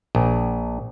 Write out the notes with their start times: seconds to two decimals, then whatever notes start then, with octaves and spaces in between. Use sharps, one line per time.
0.15 A#1